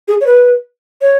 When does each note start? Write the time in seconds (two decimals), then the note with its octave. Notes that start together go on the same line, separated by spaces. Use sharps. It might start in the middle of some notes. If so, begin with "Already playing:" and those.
0.08 G#4
0.21 C#5
0.26 B4
1.02 C#5